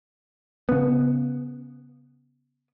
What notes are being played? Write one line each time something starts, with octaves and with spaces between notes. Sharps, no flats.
C#3 B3